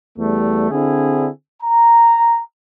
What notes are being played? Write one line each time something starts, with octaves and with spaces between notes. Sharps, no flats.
E2 G3 A3
D3 C4 D4 E4 G#4
A#5